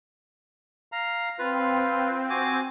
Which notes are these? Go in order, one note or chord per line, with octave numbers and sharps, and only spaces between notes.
F5 A#5
C4 F4 B4
F#4 G#5 D6